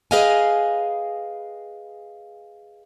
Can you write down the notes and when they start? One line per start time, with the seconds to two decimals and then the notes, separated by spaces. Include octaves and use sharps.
0.11 G#4 B4 D#5 F5 G5 G#5